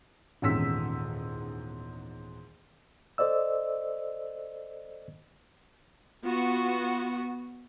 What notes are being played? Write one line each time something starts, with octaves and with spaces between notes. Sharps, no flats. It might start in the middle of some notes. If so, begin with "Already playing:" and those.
D#1 E2 G#2 C#4 E6 B6
A4 C5 D5 D#5 E6
B3 F4 F#4